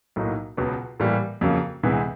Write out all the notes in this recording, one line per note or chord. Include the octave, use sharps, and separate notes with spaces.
B1 A2 F#3 A#3 D#4
C#2 B2 F#3 B3
A2 E3 G3 A#3
F2 C#3 F#3 A#3
D2 C3 E3 G#3 B3